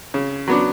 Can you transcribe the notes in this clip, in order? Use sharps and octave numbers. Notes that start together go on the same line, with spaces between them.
C#3
F#3 B3 D4